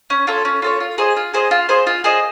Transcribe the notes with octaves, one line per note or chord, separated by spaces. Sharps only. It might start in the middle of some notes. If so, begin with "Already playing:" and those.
C#4
F4 A4 C#5
C#4
F4 A4 C#5
F4
G#4 C5 D#5
F4
G#4 C5 D#5
F4
G#4 C5 D#5
F4
G#4 C5 D#5